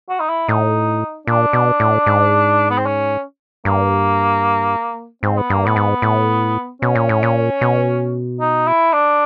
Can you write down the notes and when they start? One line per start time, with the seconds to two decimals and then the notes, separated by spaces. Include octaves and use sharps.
0.09 F#4
0.20 D#4
0.29 E4
0.48 A2 D#4
1.27 A#2 D4
1.53 B2
1.80 A2
2.06 G#2
2.70 B3
2.78 C4
2.86 C#4
3.65 G2 A#3
5.23 G#2 C4
5.37 B3
5.50 G2 A#3
5.65 A2 B3
5.76 G#2
6.02 A2
6.81 B2 C#4
6.95 A#2
7.09 A2
7.23 A#2
7.61 B2
8.40 D#4
8.67 E4
8.93 D4